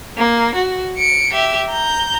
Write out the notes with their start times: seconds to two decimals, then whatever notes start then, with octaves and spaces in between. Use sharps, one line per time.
0.18 A#3
0.55 F#4
0.98 C#7 D7
1.33 G4 E5
1.71 A#5 G6